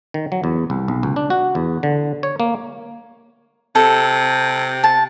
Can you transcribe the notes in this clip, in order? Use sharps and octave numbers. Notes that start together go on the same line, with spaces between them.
D#3
F#3
E2
C2
B1
C#2
D4
F#4
E2
D3
C#5
A#3
C3 A4
A5